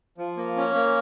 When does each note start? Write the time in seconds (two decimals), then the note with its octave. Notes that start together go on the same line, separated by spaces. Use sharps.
0.18 F3
0.37 A#3
0.56 C#4
0.75 A#3